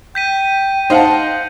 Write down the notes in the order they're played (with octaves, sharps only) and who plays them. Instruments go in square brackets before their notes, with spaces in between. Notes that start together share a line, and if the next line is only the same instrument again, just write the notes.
[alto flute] G5 [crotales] G6 B6 D#7
[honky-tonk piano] D#4 F5 [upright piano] C5 F#5 A5